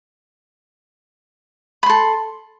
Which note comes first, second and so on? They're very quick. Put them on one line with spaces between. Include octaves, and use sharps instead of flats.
B5 C6 A4